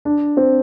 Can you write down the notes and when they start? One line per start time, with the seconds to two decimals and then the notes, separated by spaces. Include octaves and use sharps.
0.05 D4
0.37 C4